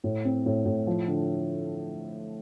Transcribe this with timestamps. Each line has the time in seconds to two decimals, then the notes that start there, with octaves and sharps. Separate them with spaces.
0.04 A2
0.25 C4
0.46 A2
0.65 A2
0.87 F3
1.08 D3